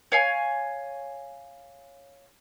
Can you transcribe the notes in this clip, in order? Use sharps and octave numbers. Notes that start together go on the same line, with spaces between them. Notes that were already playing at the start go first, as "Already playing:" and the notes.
C#5 F5 G#5